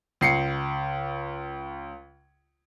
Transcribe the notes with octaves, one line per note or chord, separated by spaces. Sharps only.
C#2 C7 C#7